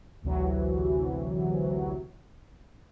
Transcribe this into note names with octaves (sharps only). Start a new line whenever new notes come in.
A1 D2 C3 E3 F#3